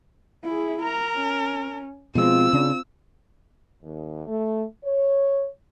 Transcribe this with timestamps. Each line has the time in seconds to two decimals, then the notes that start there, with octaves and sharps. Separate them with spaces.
0.44 E4 G#4
0.82 A#4 A#5
1.15 C#4
2.15 B2 F3 G#3 C4 F4 E6
2.53 C#3 D4
3.83 D#2
4.26 A3
4.84 C#5